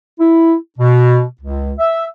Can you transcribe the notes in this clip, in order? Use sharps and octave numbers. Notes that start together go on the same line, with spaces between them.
E4
B2
C#2
E5